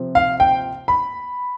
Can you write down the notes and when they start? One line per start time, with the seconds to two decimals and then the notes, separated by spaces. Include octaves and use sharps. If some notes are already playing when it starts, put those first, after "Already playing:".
Already playing: C3 F3 C4
0.15 F5
0.40 G5
0.88 B5